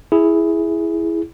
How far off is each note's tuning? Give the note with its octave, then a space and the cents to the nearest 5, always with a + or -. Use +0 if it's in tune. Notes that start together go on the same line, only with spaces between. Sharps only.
E4 +0 G#4 +0